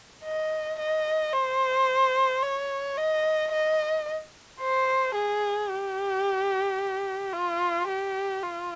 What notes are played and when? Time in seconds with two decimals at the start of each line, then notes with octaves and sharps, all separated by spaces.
0.24 D#5
0.79 D#5
1.34 C5
2.42 C#5
2.97 D#5
3.52 D#5
4.60 C5
5.15 G#4
5.69 G4
7.33 F4
7.88 G4
8.43 F4